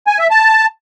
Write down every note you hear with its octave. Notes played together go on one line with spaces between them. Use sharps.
G#5
E5
A5